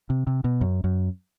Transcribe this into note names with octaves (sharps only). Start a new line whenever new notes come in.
C3
C3
B2
F#2
F#2